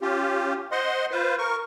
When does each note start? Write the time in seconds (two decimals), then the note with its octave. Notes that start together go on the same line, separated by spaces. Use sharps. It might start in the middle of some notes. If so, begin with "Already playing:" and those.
0.01 C#4 F4 G4
0.72 C5 D#5 F#5 C6
1.11 F4 B4 C5
1.38 A#4 C#6